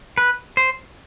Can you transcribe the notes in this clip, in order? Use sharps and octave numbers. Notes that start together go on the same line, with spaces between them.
B4
C5